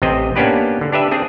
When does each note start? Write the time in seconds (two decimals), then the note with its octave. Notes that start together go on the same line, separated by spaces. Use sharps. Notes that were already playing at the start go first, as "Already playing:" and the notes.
0.02 A1 C3 C4 D#5
0.36 A#3 B3 C#4 D4 G4 B4
0.81 D3
0.92 D4 G4 B4 E5
1.11 C4 D4 G#4